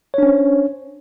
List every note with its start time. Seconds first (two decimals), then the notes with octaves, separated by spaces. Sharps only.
0.14 C#5
0.18 D4
0.23 C#4
0.27 C5